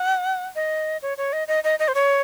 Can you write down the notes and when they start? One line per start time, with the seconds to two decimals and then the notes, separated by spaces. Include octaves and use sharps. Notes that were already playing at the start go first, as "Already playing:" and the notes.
Already playing: F#5
0.55 D#5
1.02 C#5
1.18 C#5
1.33 D#5
1.48 D#5
1.64 D#5
1.79 D#5
1.88 C5
1.95 C#5